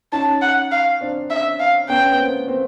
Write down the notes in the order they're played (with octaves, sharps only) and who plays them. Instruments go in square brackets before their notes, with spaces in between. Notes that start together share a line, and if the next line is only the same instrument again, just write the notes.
[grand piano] C#4 D#4 [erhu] A5
[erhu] F#5
F5
[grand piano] C4 D4
[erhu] E5
F5
[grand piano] B3 C#4 [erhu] G5
[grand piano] B3
A#3 C4
A#3 C4